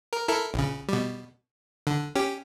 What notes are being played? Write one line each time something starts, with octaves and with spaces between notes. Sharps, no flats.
A#4
E4 A4 A#4
A#1 C#3
B2 G3
D3
C#4 G4